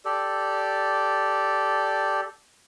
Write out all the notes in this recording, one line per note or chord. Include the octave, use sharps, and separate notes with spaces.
G4 A4 D5